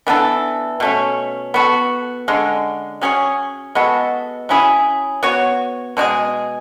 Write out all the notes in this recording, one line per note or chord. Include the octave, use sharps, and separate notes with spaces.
E3 B3 D4 A4
B2 A3 C#4
B3 F#4 A4
D3 G#3 C#4
F#3 C#4 G#4 C#5
G#3 B3 F#4 A4
F#3 C#4 E4 G#4
B3 F#4 C#5
B2 G#3 D4 G#4